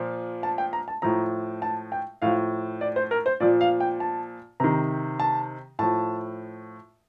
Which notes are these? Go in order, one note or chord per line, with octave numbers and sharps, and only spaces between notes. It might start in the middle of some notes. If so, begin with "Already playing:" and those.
Already playing: A#2 F3
A5
G5
A#5
A5
A2 F3 A#5
A5
G5
A2 F3 F5
D5
C5
A#4
C5
A#2 F3 D5
F5
G5
A5
C3 D#3 A#5
A5
A2 F3 A5